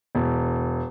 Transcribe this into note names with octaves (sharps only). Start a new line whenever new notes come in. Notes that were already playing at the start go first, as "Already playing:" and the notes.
E1